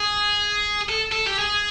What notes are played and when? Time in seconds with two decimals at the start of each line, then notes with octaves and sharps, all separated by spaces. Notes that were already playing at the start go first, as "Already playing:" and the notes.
Already playing: G#4
0.89 A4
1.12 A4
1.27 G4
1.39 G#4